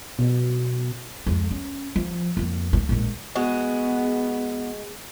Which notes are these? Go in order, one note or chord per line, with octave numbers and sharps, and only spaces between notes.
B2
F2 G#3
C#4
F3
F2 A#3
G2 A3
A#1 G#2
G#3 B3 F#4